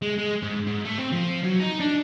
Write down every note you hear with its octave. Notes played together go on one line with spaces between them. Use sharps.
G#3
G#3
G#2
G#2
A3
C4
F3
F#3
D#4
D4